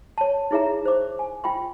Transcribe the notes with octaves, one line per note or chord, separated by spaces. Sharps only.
C#5 A5
D#4 E4 G#4 C#5 E5 A#5
C5 D6
G#5
F4 G5 B5 C6